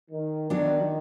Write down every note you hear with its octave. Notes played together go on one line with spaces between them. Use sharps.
D#3
D#3 F#3 B3 D4 F#4